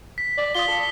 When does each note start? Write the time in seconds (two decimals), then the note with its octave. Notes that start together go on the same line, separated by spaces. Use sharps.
0.18 B6
0.37 D5
0.55 F4 D#6 B6 G7
0.68 A4